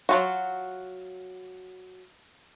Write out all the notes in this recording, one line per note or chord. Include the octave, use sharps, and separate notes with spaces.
F#3 F4 F#4